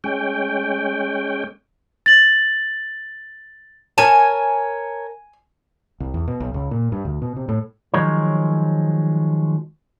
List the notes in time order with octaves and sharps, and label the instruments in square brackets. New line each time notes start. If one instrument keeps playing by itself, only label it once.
[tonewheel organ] G#3 C#4 G5
[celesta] A6 F#7
[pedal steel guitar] A#4 C#5 A5 [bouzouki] G#5
[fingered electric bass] C2
E2
B2
B1
C#2
A#2
G2
D2
B2
C3
A2
[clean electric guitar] D#3 F3 F#3 G#3 A#4 C#5